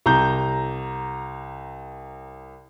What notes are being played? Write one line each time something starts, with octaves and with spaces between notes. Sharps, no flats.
C2 A#5 G6